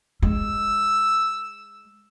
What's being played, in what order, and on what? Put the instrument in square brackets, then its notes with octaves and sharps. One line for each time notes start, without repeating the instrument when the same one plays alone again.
[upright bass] G#3 [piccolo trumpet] E6